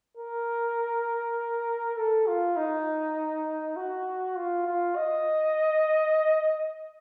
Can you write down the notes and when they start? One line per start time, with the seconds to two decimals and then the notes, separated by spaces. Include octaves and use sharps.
0.17 A#4
1.96 A4
2.27 F4
2.56 D#4
3.76 F#4
4.36 F4
4.66 F4
4.96 D#5